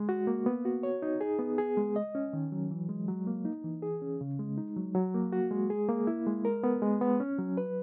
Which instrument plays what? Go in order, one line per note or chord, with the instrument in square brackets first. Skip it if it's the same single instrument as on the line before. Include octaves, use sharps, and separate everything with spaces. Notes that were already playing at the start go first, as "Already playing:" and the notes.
Already playing: [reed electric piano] G#3
F#4
A#3
B3
F#4
C#5
D#4
G#4
B3
G#4
G#3
D#5
C#4
D#3
F#3
E3
G#3
F#3
A#3
D#4
E3
G#4
C#4
C#3
G#3
D#4
F#3
F#3
A#3
F#4
G#3
G#4
A#3
E4
G#3
A#4
B3
G#3
B3
C#4
F#3
B4